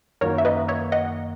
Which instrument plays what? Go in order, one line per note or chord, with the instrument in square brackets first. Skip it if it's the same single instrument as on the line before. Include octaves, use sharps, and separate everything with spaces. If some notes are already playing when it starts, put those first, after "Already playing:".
[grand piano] F#2 D#3 A#3 D#4 F#4 [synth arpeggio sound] A#4 C#5
[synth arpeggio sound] E5
B4 D#5
C#5 E5
D#5 F#5